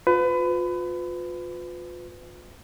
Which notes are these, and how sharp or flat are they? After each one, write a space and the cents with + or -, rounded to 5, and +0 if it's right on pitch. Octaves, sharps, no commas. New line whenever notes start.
F4 +30 B4 +30